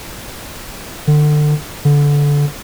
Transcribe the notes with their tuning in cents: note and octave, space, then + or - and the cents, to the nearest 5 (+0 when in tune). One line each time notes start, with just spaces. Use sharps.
D3 +30
D3 -20